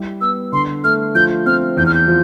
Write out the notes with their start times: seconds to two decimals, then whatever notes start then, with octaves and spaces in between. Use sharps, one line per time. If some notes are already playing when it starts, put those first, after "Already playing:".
Already playing: G3 E4
0.21 B3 E6
0.52 D3 C6
0.84 A3 F6
1.15 F3 G6
1.46 C4 F6
1.77 E2 G6
1.86 F6
1.94 G6
2.08 F3